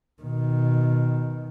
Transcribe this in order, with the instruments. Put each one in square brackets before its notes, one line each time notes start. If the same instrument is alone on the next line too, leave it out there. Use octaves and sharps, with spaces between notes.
[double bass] B2 D#3